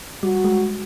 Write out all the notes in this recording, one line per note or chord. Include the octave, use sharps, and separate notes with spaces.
G3 F#4
G#3